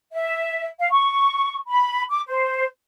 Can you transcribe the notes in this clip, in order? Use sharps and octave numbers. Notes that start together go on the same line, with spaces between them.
E5
F5
C#6
B5
D6
C5